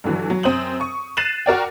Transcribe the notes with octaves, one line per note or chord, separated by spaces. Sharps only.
G2 D3 E3 F#3
F#3
F#2 C4 C5 D#6 F#7
C#6 D#6
F#6 A6 C7 D#7 E7 F#7
F#4 A#4 D5 G5